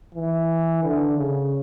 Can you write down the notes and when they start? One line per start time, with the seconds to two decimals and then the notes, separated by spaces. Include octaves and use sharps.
0.15 E3
0.83 D3
1.18 C#3